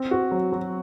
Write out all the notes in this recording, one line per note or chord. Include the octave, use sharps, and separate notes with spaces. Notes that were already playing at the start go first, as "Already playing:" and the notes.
Already playing: C4
F#4
F#3
F#3